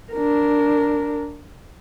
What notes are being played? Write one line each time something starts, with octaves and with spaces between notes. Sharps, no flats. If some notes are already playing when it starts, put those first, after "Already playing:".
D4 A#4